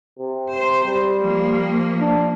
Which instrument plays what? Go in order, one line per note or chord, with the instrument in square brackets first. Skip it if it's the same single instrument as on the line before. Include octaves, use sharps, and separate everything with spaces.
[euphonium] C3
[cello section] C5
[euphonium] G3
[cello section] F3 A#3
[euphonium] D4